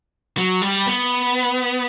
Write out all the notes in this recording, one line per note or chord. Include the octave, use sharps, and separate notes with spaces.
F#3
G3
B3